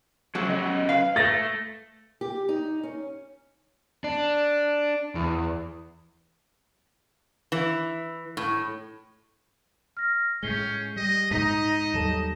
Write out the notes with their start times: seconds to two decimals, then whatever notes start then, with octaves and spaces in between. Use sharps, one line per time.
0.35 C#3 F3 F#3 A3 F#4 G4
0.50 F#2 C#4 D#5
0.89 B4 F5
1.16 A3 A6 A#6
2.21 G4
2.49 D#4
2.83 C#4
4.04 D4
5.15 E2
7.52 E3
8.37 A2
9.97 F6 A#6
10.43 A2 G#3 C#4 G6 C7 G7
10.96 G3 D#5
11.31 G#2 D#4 D#5 B6
11.94 D#2 F#3 G3 A4 A5 E7